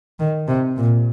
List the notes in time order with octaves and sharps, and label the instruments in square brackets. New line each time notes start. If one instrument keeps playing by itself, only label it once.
[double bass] D#3
C3
A#2